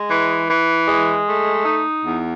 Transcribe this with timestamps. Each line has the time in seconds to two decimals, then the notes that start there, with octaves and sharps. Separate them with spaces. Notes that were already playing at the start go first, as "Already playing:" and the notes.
Already playing: G#3
0.08 E3
0.47 E3
0.87 G#3
1.26 A3
1.65 D#4
2.04 E2